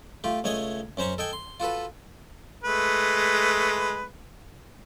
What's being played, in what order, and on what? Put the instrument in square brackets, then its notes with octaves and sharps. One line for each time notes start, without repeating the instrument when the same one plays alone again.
[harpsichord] A3 F4 G4
C#2 A3 C#5 D#5 G#5 D#6
F#2 C#4 C5 A#5 C#6
A4 D#5 G5 G#5
C6
F4 F#4 A4 B4
[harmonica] G#3 A3 B4